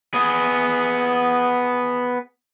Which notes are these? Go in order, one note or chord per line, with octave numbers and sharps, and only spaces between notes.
B3 G#4